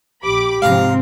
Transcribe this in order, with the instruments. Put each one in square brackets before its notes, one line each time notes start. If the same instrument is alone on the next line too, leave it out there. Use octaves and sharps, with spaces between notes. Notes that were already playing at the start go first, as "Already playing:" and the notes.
[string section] A#1 B5 D6 [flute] G4
[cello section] G#2 F3 C4 [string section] C3 [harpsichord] F5 A#5